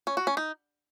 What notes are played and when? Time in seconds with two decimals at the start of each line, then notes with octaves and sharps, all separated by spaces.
0.07 C#4
0.17 F#4
0.27 C#4
0.37 D#4